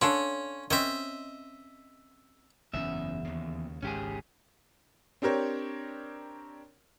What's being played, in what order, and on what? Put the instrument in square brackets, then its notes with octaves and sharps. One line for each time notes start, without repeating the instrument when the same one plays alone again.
[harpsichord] C#4 [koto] D4 A4 D5 [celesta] C#5 F5 C6
[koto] C4 C#4 [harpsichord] D#5 E5
[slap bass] F#1 G#2 C#4 [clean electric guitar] E2 E5
[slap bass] D#2 C#3
[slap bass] G#1 C#2 G#2 [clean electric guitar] C#4 G4 G#4
[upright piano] C4 D4 G4 A#4 C#5